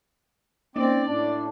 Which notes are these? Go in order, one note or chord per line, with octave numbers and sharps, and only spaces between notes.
A#3 C4 C#4 D#4 D5
A2 D4